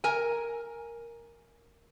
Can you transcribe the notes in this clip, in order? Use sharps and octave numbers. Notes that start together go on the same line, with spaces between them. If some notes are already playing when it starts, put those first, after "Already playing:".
A#4 G#5